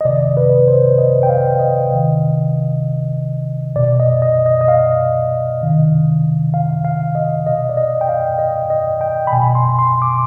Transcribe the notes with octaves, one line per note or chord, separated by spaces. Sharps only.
D#5
C3 D#3 D5
B4
C5
D#5
G5
F5
D#5
C3 D#3
B2 D5
D#5
D#5
D#5
D#5
F5
C3 D#3
F5
F5
D#5
B2 D#5
D5
D#5
G5
F5
D#5
D#5
G5
B5
B2 G#5
C6
C6
D6